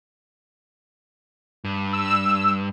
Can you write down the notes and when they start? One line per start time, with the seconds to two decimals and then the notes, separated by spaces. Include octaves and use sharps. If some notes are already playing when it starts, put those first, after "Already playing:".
1.64 G2
1.93 E6